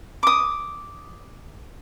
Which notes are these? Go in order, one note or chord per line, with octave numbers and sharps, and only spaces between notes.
D6 D#6